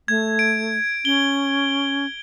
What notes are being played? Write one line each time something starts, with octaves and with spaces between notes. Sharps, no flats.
A3 G#6
D7
C#4 G7